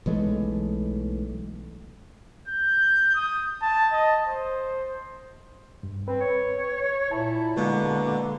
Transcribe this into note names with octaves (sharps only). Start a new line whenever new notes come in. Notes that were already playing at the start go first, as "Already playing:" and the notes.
B1 E3 G#3 A3
G6
D#6
A5
D#5
C5
G2
C4 B4
C#5
A#2 E4 A5
B2 D3 G#3 A#3